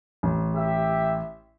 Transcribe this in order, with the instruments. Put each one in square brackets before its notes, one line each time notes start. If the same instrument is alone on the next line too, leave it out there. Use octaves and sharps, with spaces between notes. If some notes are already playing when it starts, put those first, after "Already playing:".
[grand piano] A1
[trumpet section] G4 E5